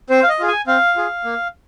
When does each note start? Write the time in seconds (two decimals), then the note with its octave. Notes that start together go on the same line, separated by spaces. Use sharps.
0.10 C4 C5
0.23 F5
0.29 D#5
0.39 F4 G#4
0.48 G#5
0.67 C4 F5
0.96 F4 G#4
1.24 A#3